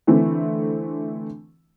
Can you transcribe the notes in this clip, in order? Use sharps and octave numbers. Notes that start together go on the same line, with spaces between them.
D3 E3 A3 C4 E4